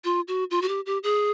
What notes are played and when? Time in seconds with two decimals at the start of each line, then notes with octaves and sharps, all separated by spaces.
0.04 F4
0.28 F#4
0.51 F4
0.62 F#4
0.68 G4
0.86 G4
1.03 G#4